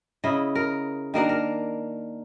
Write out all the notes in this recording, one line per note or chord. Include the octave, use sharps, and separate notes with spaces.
C#3 E4 D#5
A#4
D#3 A#3 D4 A#4
A#4